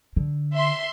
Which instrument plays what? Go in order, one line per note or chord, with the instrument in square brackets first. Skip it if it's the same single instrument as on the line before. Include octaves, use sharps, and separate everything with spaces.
[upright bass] D3
[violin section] E5 C6